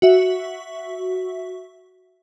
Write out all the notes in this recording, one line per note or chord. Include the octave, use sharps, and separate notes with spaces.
F#4 E5